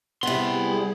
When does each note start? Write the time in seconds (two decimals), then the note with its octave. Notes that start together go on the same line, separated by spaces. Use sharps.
0.23 C3 G3 B3 E4 G#4 C6